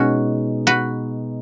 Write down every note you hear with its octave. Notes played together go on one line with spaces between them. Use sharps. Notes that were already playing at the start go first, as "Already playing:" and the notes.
Already playing: B2 G#3 C#4 D#4 F#4
F#4 B4